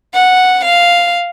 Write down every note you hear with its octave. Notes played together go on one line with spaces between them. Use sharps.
F#5
F5